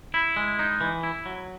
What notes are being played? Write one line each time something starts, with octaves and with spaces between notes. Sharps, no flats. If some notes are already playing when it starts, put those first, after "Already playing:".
E4
G#3
D#4
E3
E4
F#3